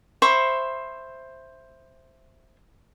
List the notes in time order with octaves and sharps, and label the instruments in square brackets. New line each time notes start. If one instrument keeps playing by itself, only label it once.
[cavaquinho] C5 E5 B5 C#6